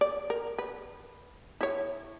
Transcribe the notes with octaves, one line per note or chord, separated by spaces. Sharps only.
D5
A#4
B4
E4 C#5